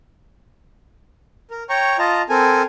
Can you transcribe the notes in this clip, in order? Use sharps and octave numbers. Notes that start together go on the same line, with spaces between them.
A#4
C#5 G5 A#5 C#6
F4 D#5 A5 A#5
C4 A4 A#4 G#5